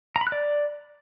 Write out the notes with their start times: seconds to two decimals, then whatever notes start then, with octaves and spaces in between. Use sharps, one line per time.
0.16 A#5
0.21 B5
0.27 F#6
0.32 D5